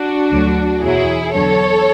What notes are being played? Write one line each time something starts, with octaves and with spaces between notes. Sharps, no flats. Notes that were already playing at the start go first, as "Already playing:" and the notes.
Already playing: D4 F#4
D2 D3 F#3
E2 B2 F#3 E4 G#4
E2 D3 F#3 A4 C#5